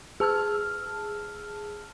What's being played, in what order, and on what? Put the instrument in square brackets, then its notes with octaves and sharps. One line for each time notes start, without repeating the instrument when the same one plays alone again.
[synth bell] G#4 A5 E6 F6